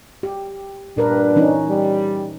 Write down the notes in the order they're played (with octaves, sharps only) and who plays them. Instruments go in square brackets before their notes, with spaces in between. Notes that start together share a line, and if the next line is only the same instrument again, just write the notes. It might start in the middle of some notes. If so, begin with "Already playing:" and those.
[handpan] G4
[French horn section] G2 D4 [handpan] A#2 A#4 B4
[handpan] E3 C#4 D#4
[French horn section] G3 G4